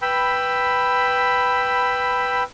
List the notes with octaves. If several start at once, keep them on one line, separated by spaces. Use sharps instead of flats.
B4 G5 B5 E6